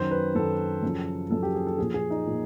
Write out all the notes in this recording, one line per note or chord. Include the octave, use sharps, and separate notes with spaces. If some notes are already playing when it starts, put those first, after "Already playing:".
Already playing: F#2 D#3 C5
B4
F#2 D#3 A4
F#2 C#3 F3
F#2 C#3 F3 A4
G4
G#4
A4
A#2 F3 G#4
G#4
D#4
A#2 F3